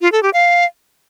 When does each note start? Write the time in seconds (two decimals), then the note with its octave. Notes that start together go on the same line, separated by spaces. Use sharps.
0.01 F4
0.12 A4
0.23 G4
0.34 F5